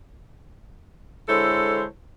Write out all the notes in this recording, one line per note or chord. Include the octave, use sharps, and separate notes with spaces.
D3 G#3 E4 A4 C5 C#5